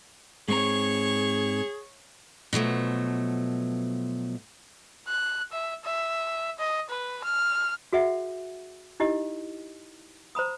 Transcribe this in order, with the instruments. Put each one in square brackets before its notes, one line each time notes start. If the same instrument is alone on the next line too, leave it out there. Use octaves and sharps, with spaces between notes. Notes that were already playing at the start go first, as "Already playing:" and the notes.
[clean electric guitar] G#2 C4 A#5 [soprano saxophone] G#4 [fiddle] C#5 C#6
[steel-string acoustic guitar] B2 F3 F#3 A3
[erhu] F#6
E5
E5
D#5
B4
F6
[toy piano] F#4 G#4 E5 F#5
D#4 E4 G4 D#5
C5 A#5 B5 D#6